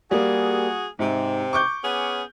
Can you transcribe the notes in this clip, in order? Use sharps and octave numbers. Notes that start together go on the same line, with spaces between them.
G3 A#3 F#4 G#4
G#2 C3
C#6 D6 G6
B3 C#4 G#4